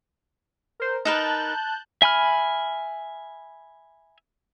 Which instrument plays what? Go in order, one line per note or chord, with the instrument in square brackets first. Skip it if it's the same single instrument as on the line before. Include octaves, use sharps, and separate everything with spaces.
[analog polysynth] A#4 C5
[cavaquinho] D#4 A#4 B4 [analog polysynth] A5 F#6 G6
[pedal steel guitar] E5 G#5 B5 F6